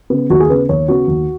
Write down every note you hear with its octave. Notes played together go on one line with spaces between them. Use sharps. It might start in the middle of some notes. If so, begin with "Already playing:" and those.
C#3 B3
D#2 F#4
G#4
C#3 B3 B4
D#2 C#5
C#3 B3 F#4
D#2